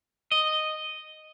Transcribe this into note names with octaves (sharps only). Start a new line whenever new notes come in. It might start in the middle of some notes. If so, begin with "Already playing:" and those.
D#5